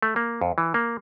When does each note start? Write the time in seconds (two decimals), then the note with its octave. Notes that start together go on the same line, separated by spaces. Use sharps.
0.02 A3
0.16 A#3
0.41 F2
0.58 E3
0.74 A#3